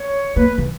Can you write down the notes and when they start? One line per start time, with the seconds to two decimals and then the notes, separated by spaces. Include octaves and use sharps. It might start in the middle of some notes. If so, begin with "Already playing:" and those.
Already playing: C#5
0.36 A#3 B4
0.58 E3